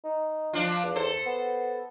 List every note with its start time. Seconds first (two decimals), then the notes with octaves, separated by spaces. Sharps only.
0.04 D#4
0.53 F3 D4 F4
0.83 E2
0.96 A4 C5
1.26 B3